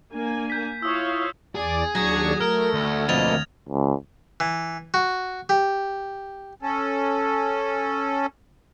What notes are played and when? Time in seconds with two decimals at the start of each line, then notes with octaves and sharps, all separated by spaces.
0.13 A#3 D4 G#5
0.50 G6 B6
0.82 E4 F4 C#5 F5 C#6 D#6 E6
1.55 E2 G#4 D5
1.95 D#2 F#3 D4 C#6 D#6 G#6 A#6
2.41 A3 A#4 F6
2.74 D2
3.09 F2 B2 A#3 D#5 A6 F7
3.69 C#2
4.40 E3
4.94 F#4
5.49 G4
6.62 C#4 A4